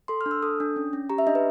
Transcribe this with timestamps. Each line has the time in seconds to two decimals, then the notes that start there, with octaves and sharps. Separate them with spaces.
0.08 A4 C6
0.21 F6
0.26 D4
0.31 E6
0.43 A4 D#6
0.60 D4
0.76 C#4
0.93 C#4
1.10 G4 A#5
1.18 E5
1.27 D4 D#5
1.35 B4